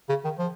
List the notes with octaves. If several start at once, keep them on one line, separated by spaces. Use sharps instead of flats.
C#3
D#3
F3